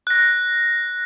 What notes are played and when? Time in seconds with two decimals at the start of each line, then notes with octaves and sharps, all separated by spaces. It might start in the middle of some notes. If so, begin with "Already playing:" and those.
0.07 F#6 A#6